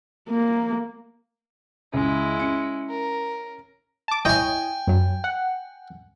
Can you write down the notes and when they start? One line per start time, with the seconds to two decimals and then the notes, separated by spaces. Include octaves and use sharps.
0.29 A#3
1.94 C#2 G#3 E4
2.40 C#4 C#7
2.90 A#4
4.08 A5 D6
4.25 E4 C#5 D#5 G5 G#5
4.87 F#2 F#3
5.24 F#5